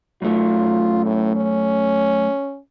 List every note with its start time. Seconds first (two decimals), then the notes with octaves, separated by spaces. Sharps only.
0.22 F#2 A3 F4
1.06 A2
1.36 C#4